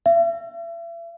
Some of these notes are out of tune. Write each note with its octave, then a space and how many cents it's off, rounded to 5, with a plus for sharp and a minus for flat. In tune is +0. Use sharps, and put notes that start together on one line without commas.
E5 +40